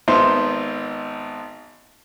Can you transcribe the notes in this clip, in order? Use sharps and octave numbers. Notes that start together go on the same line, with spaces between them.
G#1 B3 D#4 C5 E5 C6